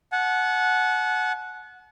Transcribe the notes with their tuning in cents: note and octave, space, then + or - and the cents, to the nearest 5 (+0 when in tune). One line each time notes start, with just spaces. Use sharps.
F#5 -10 A5 -40